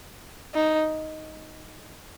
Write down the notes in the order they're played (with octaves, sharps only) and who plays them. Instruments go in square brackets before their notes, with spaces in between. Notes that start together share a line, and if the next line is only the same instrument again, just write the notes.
[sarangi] D#4